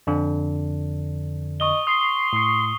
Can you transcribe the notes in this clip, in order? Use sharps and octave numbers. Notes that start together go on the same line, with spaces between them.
F2 D3 D4
D#5 C#6 D#6 G7
C6 D#6 C7 G7
A2 C#6